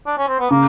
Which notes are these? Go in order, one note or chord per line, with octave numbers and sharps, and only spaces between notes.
D4
C#4
C4
B3
C#3 A#3